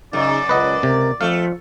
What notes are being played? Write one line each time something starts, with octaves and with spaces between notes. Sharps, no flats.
F#2 C#3 D#4 D5
C#2 B4 D#5 F#5
C#2 C3 A#4
F2 F3 A3 F5